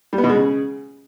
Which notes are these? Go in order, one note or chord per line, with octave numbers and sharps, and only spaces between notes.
G3
B3
B2
G#3
C#3